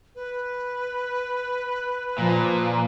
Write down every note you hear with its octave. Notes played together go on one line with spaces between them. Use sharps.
B4
A#2 F3